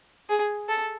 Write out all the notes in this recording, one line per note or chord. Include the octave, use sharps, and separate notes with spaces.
G#4
A4